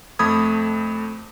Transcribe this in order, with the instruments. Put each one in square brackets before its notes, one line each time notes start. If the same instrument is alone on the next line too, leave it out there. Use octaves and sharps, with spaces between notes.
[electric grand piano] F2 A3 B5 D#6 G#6